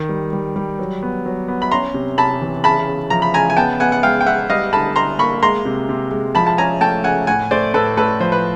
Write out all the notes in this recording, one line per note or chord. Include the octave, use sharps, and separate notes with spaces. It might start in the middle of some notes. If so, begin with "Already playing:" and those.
Already playing: D#3
G3
G3
G3
F#3
B3
F#3
B3
B5
C#4 A#5 C6
C3
C3 A5 B5
E3
C#3 A5 B5
C#3
F3 A#5
B5
C#3 G#5 A#5
G#5
B3 G5 A5
B3 F#5 G#5
F#5
G#3 F5 G5
G5
B3 E5 F#5
G3 D#5 F5
D3 A5 B5
D3 A#5 C6
A#3 B5 C#6
G#3 A#5 C6
C3
C3
G#3
F3 A5 B5
A5
C#4 G#5 A#5
A3 G5 A5
C#3 F#5 G#5
A2 F#5 G#5
A3 C5 D5
A2 A4 B4
A2 A4 B4
F3 C5
B4